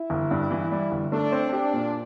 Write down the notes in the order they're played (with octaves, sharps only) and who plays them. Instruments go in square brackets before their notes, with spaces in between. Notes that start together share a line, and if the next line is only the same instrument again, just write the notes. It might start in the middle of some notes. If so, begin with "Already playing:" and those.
Already playing: [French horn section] E4
[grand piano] G1
G2
E3
G3
G1
[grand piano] A3 [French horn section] D4
[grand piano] C4
[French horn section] D4 [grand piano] G4
[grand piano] A#2